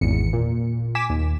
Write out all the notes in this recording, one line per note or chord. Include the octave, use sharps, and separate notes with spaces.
G#1 E2 C#7
A#2
G#5 D6 B6 E7
D#2